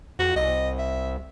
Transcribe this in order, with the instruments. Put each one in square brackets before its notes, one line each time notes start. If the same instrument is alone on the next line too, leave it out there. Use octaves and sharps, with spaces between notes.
[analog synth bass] F2 [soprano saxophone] F#4
[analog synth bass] C2 [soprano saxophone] D#5
[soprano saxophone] E5